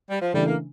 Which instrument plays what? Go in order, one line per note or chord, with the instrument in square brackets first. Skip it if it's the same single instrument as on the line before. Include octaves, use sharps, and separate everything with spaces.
[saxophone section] G3
F3
[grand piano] C#3 E3 A3 D4 [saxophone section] G3
[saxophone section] A#3